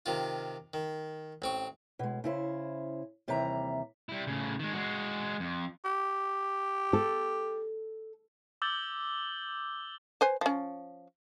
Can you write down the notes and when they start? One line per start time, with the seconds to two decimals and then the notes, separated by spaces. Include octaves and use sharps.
0.06 C3 D#3 F4
0.74 D#3
1.42 A1 C4 C#6
1.99 B2 G#3
2.24 C#3 E4 C5
3.28 D#2 C3 E3 G3 E5 A#5
4.09 G3 E4
4.27 A2 C#3
4.59 D#3 G#3
4.73 G#3 F#4
5.40 F2
5.85 G4
6.93 A4
8.62 D6 E6 G6 A6 F#7 G7
10.21 B4 C5 G#5
10.41 F3 C#4